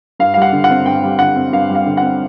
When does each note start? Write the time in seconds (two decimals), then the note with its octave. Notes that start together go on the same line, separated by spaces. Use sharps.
0.19 G2 F5
0.34 G3 F5
0.42 F#5
0.53 D3
0.64 F#5
0.70 C4
0.86 G2 G5
1.03 G3
1.19 D3 F#5
1.36 C4
1.52 G2 F5
1.69 G3
1.75 F5
1.86 D3
1.97 C4 F#5